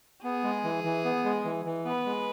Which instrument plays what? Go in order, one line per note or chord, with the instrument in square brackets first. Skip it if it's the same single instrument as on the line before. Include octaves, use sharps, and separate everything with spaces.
[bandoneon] B3 [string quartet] G#4
[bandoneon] G#3
E3
E3
B3
G#3
E3
E3
[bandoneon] B3 [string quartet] B4
[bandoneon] G#3